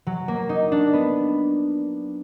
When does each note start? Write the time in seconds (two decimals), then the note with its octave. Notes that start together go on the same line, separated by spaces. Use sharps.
0.07 F#3
0.28 A#3
0.49 D#4
0.72 D4
0.93 B3